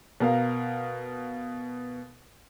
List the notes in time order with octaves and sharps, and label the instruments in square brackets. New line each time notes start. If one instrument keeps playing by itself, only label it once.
[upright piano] B2 A#4 F5